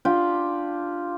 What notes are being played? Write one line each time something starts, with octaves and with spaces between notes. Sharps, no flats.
D4 F4 G4 G5